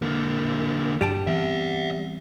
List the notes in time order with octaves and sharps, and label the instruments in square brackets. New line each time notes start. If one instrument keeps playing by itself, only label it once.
[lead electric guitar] D3 A#3
[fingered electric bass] G2 [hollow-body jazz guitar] G3 G5 A5
[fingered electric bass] E3 B3 C4 [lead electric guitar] D5 E5